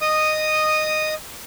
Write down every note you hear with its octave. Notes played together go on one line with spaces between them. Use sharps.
D#5 D#6